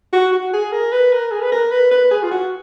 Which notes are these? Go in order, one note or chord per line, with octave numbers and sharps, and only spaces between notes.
F#4
F#4
G#4
A#4
B4
A#4
G#4
B4
A#4
B4
B4
G#4
F4
F#4